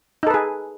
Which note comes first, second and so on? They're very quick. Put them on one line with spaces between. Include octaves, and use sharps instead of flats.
D#4 A4 B4 G#4